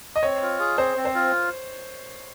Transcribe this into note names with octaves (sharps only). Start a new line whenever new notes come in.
D#5
C4 C#5
F4
G#4
C4 C5
C4
C5
F4